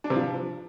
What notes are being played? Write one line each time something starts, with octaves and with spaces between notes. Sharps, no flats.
D4
C3
F3